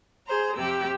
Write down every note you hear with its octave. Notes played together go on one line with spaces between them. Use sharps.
G#4 C5 A#5
F2 C3 G4 E6